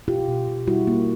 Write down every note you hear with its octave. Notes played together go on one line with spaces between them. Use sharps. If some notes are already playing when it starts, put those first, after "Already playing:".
B2 F4 G4
B2
B2
G3 E4 F#4
A#3